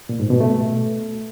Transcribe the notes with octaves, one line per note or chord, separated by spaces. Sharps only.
A#2
G#2
B2
A3